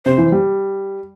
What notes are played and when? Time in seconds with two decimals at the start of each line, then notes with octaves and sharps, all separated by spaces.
0.05 C3 C5
0.18 E3
0.32 G3